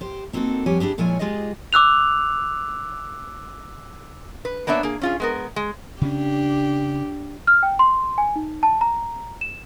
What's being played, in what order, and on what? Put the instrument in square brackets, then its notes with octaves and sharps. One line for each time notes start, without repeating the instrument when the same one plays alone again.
[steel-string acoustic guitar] G4 C5
A#3 C4 D#4 F#4 A4
F2 G3 G4 B4 C#5 G#5
D4 E4 G4 G#4
A#2 F3 G#3 E4 C#5 G#5
G#3 F4 G4 G#4 D#5
[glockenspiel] D6 E6 F#6 F7
[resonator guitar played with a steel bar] B4
A#3 B3 D4 C#5 E5
A#3 G#4
C#4 F4 G#4
G#3 B3 A#4
G#3
[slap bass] C#3 C#4 [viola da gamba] D4 G4
[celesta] F6
G5
C6
G#5
D#4
A5
A#5
E7